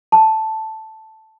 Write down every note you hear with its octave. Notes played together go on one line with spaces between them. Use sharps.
A5